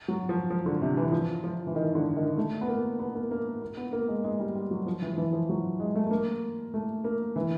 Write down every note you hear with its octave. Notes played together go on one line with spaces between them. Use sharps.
F#3
F3
F3
D3
C3
E3
F3
F3
E3
D#3
D3
D#3
A3
B3
A#3
B3
A#3
A#3
A#3
B3
A#3
G#3
G#3
G3
G3
F#3
F3
E3
F3
E3
F3
F#3
G#3
A3
A3
A#3
A3
A#3
E3